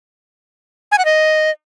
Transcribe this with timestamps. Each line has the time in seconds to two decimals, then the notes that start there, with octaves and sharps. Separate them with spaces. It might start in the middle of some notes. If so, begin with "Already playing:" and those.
0.92 G#5
0.98 F#5
1.05 D#5